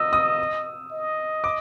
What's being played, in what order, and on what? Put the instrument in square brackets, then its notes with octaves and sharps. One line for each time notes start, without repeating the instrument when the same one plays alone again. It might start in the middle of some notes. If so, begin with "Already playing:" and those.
Already playing: [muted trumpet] D#5 [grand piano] E6
[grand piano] D#6
[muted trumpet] D#5
[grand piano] D6